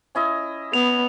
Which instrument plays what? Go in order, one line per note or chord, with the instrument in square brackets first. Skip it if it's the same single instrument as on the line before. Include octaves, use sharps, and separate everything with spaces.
[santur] C#4 E4 D#5
[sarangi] B3 [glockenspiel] F7